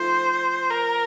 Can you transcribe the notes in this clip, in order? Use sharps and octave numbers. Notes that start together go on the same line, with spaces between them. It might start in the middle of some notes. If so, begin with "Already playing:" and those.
Already playing: F3 A3 D#4 C5
A#4